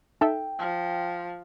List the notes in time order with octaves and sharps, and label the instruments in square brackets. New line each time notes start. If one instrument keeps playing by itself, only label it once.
[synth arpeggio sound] D#4 A4 E5 [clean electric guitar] G5
[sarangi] F3